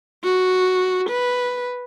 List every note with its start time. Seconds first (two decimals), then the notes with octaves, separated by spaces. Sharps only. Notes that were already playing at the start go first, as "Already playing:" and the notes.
0.24 F#4
1.10 B4